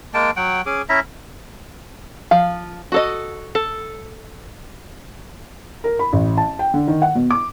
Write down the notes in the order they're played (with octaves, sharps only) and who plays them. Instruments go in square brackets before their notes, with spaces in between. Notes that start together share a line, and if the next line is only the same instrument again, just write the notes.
[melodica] G#3 A#3 G5 A5
F#3 F#5 G5
C#4 G#4 D6
C#4 E4 E5 A#5
[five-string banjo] F3 [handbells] F5
[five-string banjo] F#4 A4 D#5
A4
[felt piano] A#4
B5
A1
A5
G5
D3
D#3
F#5
B2
D6